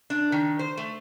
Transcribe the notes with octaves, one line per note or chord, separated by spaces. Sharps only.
D4
D#3
C5
A3